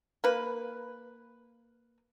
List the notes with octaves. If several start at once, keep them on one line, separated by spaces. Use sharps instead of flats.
A#3 B4